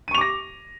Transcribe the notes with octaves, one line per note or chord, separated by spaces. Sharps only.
C#6 D6 A#6 D#7 F7